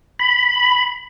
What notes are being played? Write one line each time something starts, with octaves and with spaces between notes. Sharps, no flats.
B5